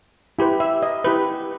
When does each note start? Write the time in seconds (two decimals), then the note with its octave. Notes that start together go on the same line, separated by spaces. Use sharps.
0.39 E4 G4 B4
0.60 E5
0.82 D#5
1.04 E4 G4 B4